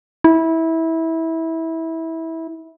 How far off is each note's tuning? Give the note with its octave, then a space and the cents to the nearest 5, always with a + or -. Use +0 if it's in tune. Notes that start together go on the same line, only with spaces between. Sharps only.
E4 -20